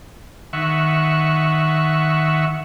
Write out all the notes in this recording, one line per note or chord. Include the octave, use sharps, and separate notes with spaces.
D#3 E5 F#5 C#6